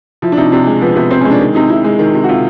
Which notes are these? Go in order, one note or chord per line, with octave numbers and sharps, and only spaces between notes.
F3 E4
D4
C3 D#4
C3 D4
G#3
F3 B3
C3 B3
C3 C4
G#3 C#4
D4
D#3
C3 D#4
C3 E4
G#3
D#3
C3
F#4
C3 F4